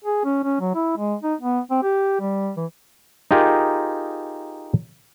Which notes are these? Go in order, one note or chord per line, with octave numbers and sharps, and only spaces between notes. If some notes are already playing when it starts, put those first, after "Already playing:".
G#4
C#4
C#4
F#3
E4
G#3
D#4
B3
C4
G4
G3
E3
D#4 F4 G4 G#4 A#4